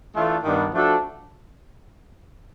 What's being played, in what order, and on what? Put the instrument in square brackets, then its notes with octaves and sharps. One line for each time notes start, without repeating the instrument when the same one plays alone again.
[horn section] E3 A3 D4 F4 A4
G2 D#3 G3 B3 D4
F3 A3 D4 F#4 A4